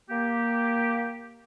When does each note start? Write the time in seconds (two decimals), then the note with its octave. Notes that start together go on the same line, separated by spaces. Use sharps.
0.10 A#3 G4